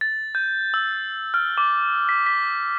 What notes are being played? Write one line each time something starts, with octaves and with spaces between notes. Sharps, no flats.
A6
G6
E6
F6
D6
B6
B6